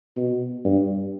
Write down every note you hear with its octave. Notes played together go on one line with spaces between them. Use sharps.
B2
G2